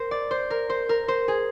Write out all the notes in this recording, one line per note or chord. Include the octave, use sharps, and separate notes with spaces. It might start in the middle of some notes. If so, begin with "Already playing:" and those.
Already playing: A#4 C5
D5
C5
A#4
C5
A#4
C5
G#4